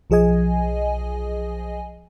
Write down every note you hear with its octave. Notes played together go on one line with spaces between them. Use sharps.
B1 F3 G#4 D#5 G#5